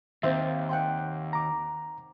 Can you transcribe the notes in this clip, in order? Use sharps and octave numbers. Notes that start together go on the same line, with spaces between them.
D#2 C4 C5 E5 F5
F#5 G5 C6
A#5 D6